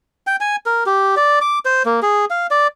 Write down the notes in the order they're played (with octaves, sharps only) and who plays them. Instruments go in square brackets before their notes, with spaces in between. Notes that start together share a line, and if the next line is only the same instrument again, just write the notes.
[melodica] G5
G#5
A#4
G4
D5
D6
C5
A#3
G#4
F5
D5